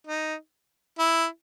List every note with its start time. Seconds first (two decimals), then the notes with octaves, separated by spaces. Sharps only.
0.07 D#4
0.99 E4